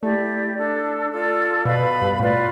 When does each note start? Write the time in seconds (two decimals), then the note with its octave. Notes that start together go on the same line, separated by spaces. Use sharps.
0.03 A3 E4 G4 D5
0.57 D4 A4 D5
1.12 F4 A4 D5
1.65 B2 B4 F5 B5
1.84 B2
2.02 G2
2.19 A2 F4 B4 D5